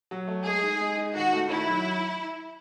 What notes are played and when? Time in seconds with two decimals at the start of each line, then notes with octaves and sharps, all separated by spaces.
0.11 F#3
0.28 A3
0.45 G#3 G#4
0.63 D#4
0.80 G#3
0.97 D#4
1.15 D#3 F#4
1.33 A3
1.51 D#3 E4
1.67 F#3